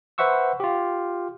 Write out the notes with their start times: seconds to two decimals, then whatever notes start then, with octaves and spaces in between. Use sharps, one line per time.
0.18 B4 C5 E5 F#5 C#6 E6
0.60 F4 G4